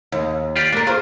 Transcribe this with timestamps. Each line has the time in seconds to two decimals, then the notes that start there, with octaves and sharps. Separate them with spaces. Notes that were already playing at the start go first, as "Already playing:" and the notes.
0.12 D#2
0.56 F4 G4 D5
0.73 A#3 D4 A#4
0.87 F4 G#4 C5